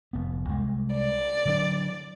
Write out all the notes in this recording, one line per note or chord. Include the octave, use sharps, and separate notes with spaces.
F1 B3
C2 G#3
D5
D3 F#3 D4